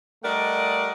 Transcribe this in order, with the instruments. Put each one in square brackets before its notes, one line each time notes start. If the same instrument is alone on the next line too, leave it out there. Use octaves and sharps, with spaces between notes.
[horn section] G3 A3 A#4 D5 D#5 F#5